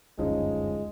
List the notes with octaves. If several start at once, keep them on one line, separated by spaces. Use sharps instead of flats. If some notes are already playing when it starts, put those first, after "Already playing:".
F#1 D2 G2 F3 G#3 C#4 D#4